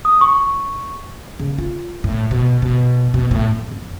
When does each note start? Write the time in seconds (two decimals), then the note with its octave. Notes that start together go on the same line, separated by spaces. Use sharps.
0.05 D#6
0.21 C#6
1.39 C#3
1.58 F4
2.04 A2
2.31 B2
2.62 B2
3.14 B2
3.31 A2
3.51 F2
3.72 F2